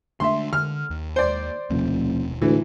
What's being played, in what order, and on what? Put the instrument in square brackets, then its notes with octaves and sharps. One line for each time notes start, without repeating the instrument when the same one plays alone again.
[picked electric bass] D3 A3 D4 [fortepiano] E5 C6
[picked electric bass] D3 [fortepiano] F6
[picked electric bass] D#2
[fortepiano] C5 D5
[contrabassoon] F1 [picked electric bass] D#2 B2
[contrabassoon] D2 [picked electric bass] A2 D3 [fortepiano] E3